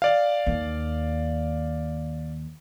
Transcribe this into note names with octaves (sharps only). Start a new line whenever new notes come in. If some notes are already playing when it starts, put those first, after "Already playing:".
D5 F5
D#2